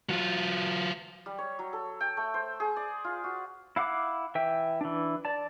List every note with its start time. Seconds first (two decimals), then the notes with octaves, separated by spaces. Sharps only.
0.09 F#3 F4
1.26 G3
1.38 C#5
1.59 F#3
1.73 A4
2.01 G5
2.17 A3
2.34 C5
2.60 G#4
2.76 D5
3.04 F4
3.24 F#4
3.76 E4 F5 F#5 D6
4.35 E3 E5 G5
4.81 E3 D4
5.25 D5 A5